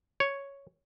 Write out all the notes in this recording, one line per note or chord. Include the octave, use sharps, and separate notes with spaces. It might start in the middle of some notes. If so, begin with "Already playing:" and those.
C#5